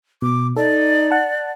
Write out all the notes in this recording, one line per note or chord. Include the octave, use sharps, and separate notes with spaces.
B2 D6
D#4 A4 D5
F#5 A5